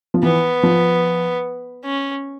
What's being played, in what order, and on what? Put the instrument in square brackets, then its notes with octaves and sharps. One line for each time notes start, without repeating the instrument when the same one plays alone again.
[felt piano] F3
[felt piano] E3 [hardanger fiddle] B3
[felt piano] F3
[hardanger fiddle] C#4